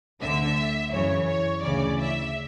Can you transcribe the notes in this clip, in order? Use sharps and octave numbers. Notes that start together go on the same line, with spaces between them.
D2 D3 E5
F#2 C#3 E3 C#5
C#5
D2 C#3 E3 D5
E5